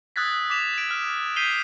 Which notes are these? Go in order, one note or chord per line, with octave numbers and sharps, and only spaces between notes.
D#6 E6 F#6 G#6 A6 B6
D6 B6 E7 F7
G#6 D7
F6
G6 B6 C7 D#7 F7 G7